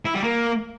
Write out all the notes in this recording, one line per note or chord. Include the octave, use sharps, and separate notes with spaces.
E4
G3
A#3